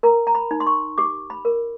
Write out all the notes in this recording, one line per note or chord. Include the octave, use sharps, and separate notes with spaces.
A#4 A#5
A#5
B5
D#4
C6
C#6
G4 D6
B5
A#4